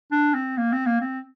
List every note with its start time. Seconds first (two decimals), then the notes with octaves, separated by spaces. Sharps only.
0.12 D4
0.35 C4
0.57 A#3
0.72 C4
0.86 A#3
1.01 C4